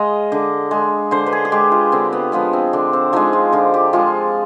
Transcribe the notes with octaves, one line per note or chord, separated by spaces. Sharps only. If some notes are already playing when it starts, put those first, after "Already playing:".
Already playing: G#3 D#5 F5
D3
G#3
D3 C5
B4
G#4
G#4
G#3 G4
F4
D3 C4
B3
F3 G#3 B3
C4
D3 D4
C4
F3 G#3 D#4
F4
D3 F4
G4
F3 G#3 F4